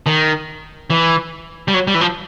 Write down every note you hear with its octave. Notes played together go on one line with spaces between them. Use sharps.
D#3
E3
G3
F#3
G3
E3
F3